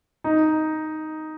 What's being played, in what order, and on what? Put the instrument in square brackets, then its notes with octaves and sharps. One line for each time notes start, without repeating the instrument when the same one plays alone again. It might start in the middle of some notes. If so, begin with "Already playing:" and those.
[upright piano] D#4